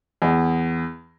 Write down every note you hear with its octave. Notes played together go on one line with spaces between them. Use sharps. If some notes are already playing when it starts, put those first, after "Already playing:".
E2